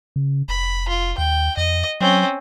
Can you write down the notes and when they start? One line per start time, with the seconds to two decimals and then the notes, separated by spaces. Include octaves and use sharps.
0.16 C#3
0.48 F1 B5
0.89 F4
1.18 D#2 G5
1.57 F2 D#5
2.01 F#3 C4 C#4